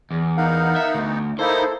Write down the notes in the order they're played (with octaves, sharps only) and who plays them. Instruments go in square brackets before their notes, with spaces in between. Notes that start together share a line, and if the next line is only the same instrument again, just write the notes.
[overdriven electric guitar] E2
[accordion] B3 D#4 [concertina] A#4 F5 F#5
[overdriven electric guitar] E5
D2
[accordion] A#3 D#4 E4 [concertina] A4 [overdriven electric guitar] C5